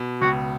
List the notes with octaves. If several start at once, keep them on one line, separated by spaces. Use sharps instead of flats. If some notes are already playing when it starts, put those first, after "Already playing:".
Already playing: B2
C#2 F#4